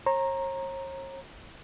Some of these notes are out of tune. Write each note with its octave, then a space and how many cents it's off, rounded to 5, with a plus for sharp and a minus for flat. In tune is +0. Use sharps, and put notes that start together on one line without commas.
C#5 -45 A#5 +0